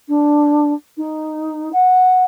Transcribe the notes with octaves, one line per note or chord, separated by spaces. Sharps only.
D4
D#4
F#5